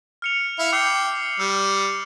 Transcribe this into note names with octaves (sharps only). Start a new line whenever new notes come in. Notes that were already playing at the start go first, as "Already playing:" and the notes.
F6 C#7 F7
E4 E5 F5
G5 D6 E6 C7
G3 E6